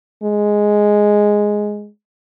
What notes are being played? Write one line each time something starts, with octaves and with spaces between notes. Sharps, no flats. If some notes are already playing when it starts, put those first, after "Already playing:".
G#3